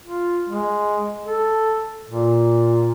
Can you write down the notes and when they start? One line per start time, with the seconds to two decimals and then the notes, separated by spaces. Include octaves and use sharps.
0.04 F4
0.49 G#3
1.26 A4
2.09 A#2